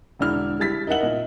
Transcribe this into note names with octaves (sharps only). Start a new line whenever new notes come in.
E1 D3 D4 E4 F6
G3 E4 A6 B6
D#4 A#4 E5 F#5 F#7
A#2 D#5